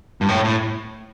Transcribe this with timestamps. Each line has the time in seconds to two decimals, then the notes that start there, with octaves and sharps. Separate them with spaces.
0.21 G2
0.28 A2
0.44 A2